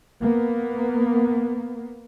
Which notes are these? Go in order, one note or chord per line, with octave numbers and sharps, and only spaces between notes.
A#3 B3